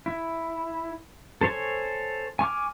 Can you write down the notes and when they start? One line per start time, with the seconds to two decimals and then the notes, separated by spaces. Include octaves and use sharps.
0.06 E4
1.41 A4 C5 C#5 G#5 C#6
2.39 G#5 C#6 D6 F6